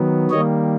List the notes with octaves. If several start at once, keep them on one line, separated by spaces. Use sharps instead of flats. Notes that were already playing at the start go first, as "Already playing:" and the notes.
Already playing: D#3 F#3 B3
D#3 G3 A#3 C#5 D#5